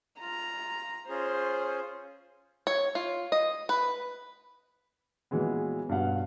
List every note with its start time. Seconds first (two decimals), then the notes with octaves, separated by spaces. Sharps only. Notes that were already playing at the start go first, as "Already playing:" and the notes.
0.21 F4 A#5
1.09 C#4 F4 G#4 C5
2.67 C#5
2.95 F4
3.32 D#5
3.69 B4
5.31 A#2 E3 F#3 G#3 B3
5.89 G2 B2 F#3 F5 F#5